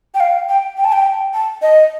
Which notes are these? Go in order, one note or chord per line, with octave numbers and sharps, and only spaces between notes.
G5
F5
G5
G5
A5
G5
A5
D#5